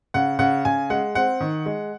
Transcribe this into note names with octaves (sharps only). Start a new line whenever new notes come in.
C#3 F#5
C#3 F#5
C#3 G#5
G#3 F#5
C4 F#5
D#3
G#3